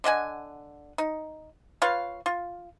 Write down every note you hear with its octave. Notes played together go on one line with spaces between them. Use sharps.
D3 D#5 F#5 G#5
D#4
F4 B4 C#5 F5
F4